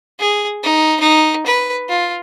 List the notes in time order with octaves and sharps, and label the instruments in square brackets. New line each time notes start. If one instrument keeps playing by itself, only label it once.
[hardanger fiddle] G#4
D#4
D#4
B4
F4